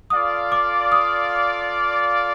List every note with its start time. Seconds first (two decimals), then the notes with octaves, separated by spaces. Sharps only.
0.10 F4 A4 D5 F5 D#6
0.52 D6
0.92 D#6